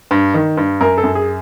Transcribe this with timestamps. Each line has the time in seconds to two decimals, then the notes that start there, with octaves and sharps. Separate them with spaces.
0.11 G2
0.34 D#3
0.57 G2
0.81 F#2 A#4
0.98 A4
1.04 F#2
1.15 G#4